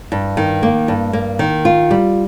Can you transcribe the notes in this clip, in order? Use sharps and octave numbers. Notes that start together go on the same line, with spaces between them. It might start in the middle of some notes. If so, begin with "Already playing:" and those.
G2
D#3
A#3
G2
A#3
D#3
F4
G3